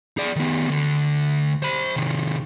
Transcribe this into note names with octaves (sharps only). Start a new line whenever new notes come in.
G#4 D5
D#3 B3
D2 D3
C5 B5
C3 D#3